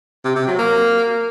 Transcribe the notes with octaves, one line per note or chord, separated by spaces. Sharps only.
C3
C3
F#3
A#3